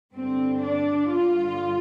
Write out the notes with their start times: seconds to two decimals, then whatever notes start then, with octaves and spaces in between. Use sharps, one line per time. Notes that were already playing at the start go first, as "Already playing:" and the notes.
0.15 G2 D3 C4
0.63 D4
1.09 G2 D3 F4